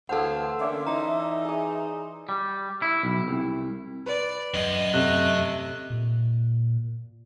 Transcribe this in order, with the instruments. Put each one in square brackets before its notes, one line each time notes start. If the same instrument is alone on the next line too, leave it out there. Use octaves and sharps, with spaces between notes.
[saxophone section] D2 E3 F5 [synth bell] A4 F#5 [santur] C5 A5 E6
[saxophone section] D3 A#3 C#4 [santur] D5 C6 [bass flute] E5
[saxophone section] E3 D#4 [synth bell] A#5
[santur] G#4 D#6
[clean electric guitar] G3
E4
B1
C2
[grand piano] B4 [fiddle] D5
[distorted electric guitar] F#2 [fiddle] D#5 [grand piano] F#7
[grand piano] C3 [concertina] A3 F#6
[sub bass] A#2